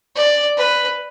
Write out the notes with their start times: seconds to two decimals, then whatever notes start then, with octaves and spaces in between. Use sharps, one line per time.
0.16 D5
0.57 B4